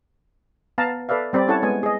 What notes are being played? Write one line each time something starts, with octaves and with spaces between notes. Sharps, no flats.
B3 F5 A5 A#5
A4 B4 D5 E5 F5
G3 C4 G4 D5 B5
C#4 E4 A4 C#5 F#5 A5
G#3 B3 G#5
G#4 D#5